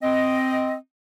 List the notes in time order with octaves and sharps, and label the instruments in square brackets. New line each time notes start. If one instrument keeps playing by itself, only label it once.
[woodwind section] C4 D#5